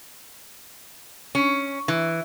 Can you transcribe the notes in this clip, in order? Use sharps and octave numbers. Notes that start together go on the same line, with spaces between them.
C#4
E3